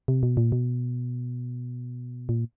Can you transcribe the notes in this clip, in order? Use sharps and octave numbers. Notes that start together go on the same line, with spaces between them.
C3
B2
A#2
B2
A#2